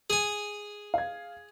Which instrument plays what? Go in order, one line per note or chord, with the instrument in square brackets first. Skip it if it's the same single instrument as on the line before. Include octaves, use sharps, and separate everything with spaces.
[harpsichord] G#4 G#5
[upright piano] F5 G#6